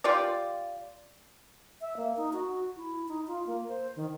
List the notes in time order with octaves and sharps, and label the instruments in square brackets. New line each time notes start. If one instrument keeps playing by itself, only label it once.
[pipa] F4 G4 D5
[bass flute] E5
A#3
D#4
F#4
E4
D#4
F4
A#3
C5
D#3